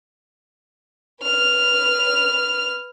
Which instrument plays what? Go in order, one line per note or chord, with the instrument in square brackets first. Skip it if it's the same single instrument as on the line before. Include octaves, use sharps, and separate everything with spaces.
[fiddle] B4 F6